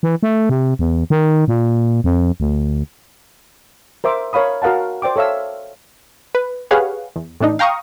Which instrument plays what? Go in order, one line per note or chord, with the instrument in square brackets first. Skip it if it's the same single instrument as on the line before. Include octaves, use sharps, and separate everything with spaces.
[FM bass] E3
A3
C3
E2
D#3
A#2
F2
D2
[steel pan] A#4 C5 E5 D6
A#4 C#5 F5 B5 D#6
F#4 A#4 F5 F#5 A5
C5 D5 G5 D6
A4 C#5 E5 F5 E6
[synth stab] B4
G4 G#4 B4 C#5 F5 F#5
E2
A2 E3 D4 D#4
F5 G5 A#5 C#6 D#6